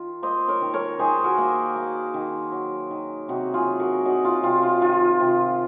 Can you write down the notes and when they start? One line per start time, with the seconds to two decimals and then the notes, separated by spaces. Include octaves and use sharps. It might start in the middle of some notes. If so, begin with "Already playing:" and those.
Already playing: D#3 F4
0.23 A#3 C5 D#5
0.48 A#4 C#5
0.61 D#3
0.74 A#4 C#5
0.99 D#3 G#4 C5
1.24 F#4 A#4
1.38 A#3
1.76 A#3
2.14 D#3
2.52 F#3
2.91 D#3
3.28 C3 D#4 F#4
3.54 F4 G#4
3.67 F#3
3.80 F#4 A#4
4.05 F#3 D#4 F#4
4.25 F4
4.43 C3 F4
4.63 F4
4.82 D#3 F4
5.20 C3